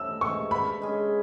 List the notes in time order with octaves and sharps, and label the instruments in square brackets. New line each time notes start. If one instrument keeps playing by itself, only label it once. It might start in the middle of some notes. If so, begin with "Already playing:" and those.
Already playing: [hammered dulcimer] A2 [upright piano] E6
[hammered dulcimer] E3 G#3 [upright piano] C#6
[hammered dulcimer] D3 [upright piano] B5
[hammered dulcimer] G#3 C#4 G#4